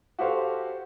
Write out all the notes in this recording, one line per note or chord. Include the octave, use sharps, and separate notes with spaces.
F#4 G4 A4 C5 F5